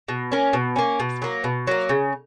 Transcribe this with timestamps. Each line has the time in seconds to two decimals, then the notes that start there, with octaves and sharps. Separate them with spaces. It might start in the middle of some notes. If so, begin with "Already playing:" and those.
0.08 B2
0.32 A#3 C#4
0.53 B2
0.76 A#3 C#4
1.00 B2
1.22 F#3 A#3
1.44 B2
1.67 F#3 A#3
1.89 C#3